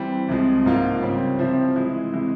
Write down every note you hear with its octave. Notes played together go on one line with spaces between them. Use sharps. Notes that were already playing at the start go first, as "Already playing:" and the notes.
Already playing: E3 G3 C4
C2 C3 F3 G#3
G#2 F3 A#3 F4 A#4
C#3 G3 C4
C3 F3 C4 E4
E3 G#3 E4
C3 E3 G#3 E4